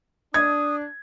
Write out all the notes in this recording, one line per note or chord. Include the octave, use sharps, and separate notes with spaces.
D4 D#6 G#6